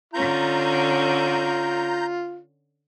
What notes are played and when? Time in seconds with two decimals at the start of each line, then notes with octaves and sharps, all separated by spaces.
0.14 D3 C#4 F4 A#5 G6